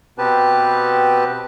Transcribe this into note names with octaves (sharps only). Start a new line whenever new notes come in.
B2 B3 C4 G4 B4 A5